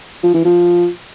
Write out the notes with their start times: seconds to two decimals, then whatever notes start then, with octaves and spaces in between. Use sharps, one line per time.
0.23 F3
0.34 E3
0.45 F3